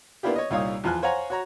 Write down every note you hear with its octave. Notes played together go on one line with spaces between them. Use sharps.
A#3 B3 D4 E4 F4 G4
C#5 D#5
C2 A#2 D#4 C#5 F5 D#6
E2 F3 F4 G#5 F6 F#6
C5 C#5 F5 F#5 G#5 A#5
F#4 C#5 A#5